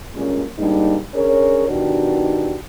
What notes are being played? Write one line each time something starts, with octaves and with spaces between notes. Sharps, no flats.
G2 A#2 G#3 A#3 C#4
G#2 G3 A#3 D4 D#4
C#4 D4 G#4 A#4 C#5
B2 D#3 D4 D#4 F#4 G4